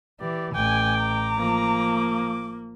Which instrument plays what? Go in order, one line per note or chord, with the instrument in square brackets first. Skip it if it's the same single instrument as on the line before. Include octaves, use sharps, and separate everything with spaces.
[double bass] E3 [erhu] G4 [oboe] D5
[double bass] A1 [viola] G5 [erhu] G#5 [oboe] D6
[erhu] A#5
[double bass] F3 [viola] A#3